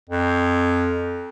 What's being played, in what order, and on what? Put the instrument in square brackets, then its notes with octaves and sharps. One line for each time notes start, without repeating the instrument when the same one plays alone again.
[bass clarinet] F2